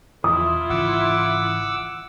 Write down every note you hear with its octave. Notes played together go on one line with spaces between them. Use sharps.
E2 B2 F3 E4 F4 D#6
G#1 C#3 E3 F#5 D6 E6